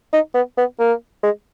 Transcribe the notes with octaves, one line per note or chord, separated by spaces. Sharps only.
D#4
B3
B3
A#3
G#3